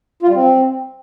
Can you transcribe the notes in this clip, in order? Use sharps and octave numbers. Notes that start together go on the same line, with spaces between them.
F4
G3
C4